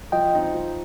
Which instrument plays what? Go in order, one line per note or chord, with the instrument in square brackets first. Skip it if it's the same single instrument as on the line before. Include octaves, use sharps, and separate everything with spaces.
[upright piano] F3 [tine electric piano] D#5 G5
[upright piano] C4 D#4
F3